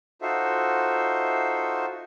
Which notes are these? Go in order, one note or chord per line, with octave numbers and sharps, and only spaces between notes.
D#4 F4 F#4 A4 C5 E5